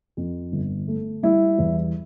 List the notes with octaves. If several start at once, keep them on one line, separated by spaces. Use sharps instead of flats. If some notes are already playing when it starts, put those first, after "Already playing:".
F2
G1
A3
G3 E4
E2